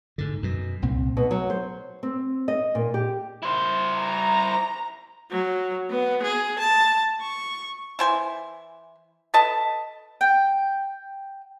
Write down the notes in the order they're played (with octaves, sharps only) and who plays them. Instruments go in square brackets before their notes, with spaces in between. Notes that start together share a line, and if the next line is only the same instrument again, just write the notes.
[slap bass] G#2 D3
F#2 B2
C2 A#2 C4
[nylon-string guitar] B2
F#3
C5
C4
D#5
A#2
G4
[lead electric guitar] E4 C5
[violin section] A#5
[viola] F#3
B3
G#4
A5
C#6
[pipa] E3 C5 G#5
A4 B4 D#5 A5
[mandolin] G5